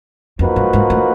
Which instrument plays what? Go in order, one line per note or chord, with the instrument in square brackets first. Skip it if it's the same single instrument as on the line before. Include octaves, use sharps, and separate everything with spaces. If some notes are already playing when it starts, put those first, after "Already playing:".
[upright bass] F2 [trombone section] F3 A#3 D#4 F#4 B4
[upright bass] G2
G#2
A2